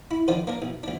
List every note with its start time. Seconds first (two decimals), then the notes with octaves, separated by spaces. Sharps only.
0.11 E4
0.28 D3 D#3 F3 C4 D4
0.47 A#3 D4 A#4
0.62 B1
0.83 D2 D4